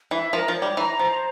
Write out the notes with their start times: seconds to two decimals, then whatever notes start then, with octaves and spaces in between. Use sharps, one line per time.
0.11 E3 E5
0.33 F3 A#4
0.48 F3
0.55 C#5
0.62 G3
0.77 E3 A#5
0.99 F3 C5